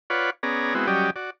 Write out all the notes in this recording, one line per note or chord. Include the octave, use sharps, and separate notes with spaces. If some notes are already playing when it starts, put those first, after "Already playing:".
F4 B4 C#5 D5 F#5
B3 C#4 G#4 D5 A#5
G#3 B3 C4 E4 F#4
F#3 G3 C#4 G4 D5 D#5
F#4 D5